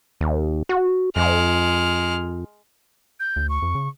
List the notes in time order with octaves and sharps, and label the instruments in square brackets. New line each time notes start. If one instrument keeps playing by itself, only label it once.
[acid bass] D#2
F#4
[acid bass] F2 [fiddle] G#3 F6
[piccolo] G6
[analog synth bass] D2
[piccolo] C#6
[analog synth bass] F2
C#3